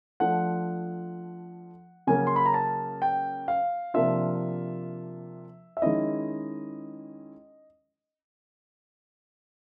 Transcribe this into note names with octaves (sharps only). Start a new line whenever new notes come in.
F3 A3 D4 F4 F#5
C#3 F#3 A#3 C#4 G#5
C6
B5
A#5
A5
G5
F5
C3 F3 A#3 D4 F4 E5
E5
D#3 G#3 C#4 E4 D#5